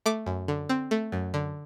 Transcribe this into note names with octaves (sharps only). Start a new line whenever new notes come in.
A3 D6
F#2
D3
C4
A3
F#2
D3